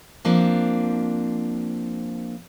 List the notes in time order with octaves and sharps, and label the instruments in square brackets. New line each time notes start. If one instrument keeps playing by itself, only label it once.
[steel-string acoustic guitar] F3 A#3 C4 D4